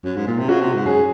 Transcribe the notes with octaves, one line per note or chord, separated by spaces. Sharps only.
F#2
G#2
A#2
C3
C#3 F#4
C3
G#2
F#2 G#4